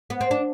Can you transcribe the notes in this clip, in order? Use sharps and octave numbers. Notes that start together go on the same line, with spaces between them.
B3
C4
D4